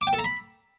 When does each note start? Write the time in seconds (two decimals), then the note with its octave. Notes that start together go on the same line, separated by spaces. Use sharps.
0.01 D6
0.07 G5
0.13 A4
0.19 A#5
0.24 B5